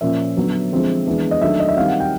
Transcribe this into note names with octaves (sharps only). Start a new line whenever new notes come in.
A#2 F3 A#3 C#4 E5
D3 F#3 B3
D3 F3 G#3 C4
E3 G#3 B3 D4
D#5
D#3 F#3 A3 D4 E5
D#5
E5
D#3 G3 C4 F5
F#5
G5